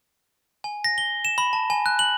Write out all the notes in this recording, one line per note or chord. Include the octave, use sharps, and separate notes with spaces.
G#5
A#6
G7
E7
B5
A5
G#5
F#6
F#7